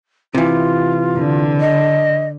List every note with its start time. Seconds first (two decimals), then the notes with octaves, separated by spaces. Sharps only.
0.34 C3 E3 F4
1.18 D3
1.60 D#5